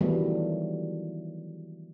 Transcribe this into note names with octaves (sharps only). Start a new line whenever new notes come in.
D#3 E3 F#3 G3 A3 B3